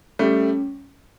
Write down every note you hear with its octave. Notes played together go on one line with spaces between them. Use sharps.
G3 A3 C#4